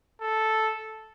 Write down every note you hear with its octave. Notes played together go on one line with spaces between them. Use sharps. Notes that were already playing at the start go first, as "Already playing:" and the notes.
A4